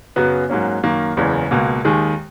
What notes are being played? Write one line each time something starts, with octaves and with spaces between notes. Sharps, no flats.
F#2 C#3 F#3 B3 F#4
G#2 F#3 A#3 C#4
F#2 D#3 A#3
F#1 E2 C#3 E3
C#2 B2 A#3
D#2 D#3 G#3